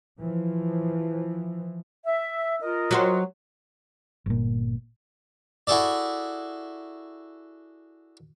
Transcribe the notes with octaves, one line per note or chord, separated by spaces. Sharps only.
E3 F3
E5
F4 A#4 D#5
F#3 F#4 C5
G1 A#2
E4 F#4 G#4 A4 D5